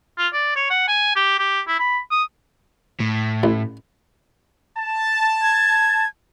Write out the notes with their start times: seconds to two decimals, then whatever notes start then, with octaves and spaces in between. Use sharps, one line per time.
0.18 F4
0.33 D5
0.56 C#5
0.70 F#5
0.88 G#5
1.16 G4
1.39 G4
1.68 E4
1.79 B5
2.11 D#6
3.00 A2
3.43 A1
4.78 A5
5.42 G#6